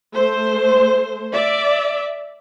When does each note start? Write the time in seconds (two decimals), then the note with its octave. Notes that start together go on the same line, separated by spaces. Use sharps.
0.12 A3 C5
1.32 D5 E5